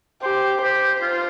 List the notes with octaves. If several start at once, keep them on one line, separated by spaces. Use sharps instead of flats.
G4 C5
G4 C5
F4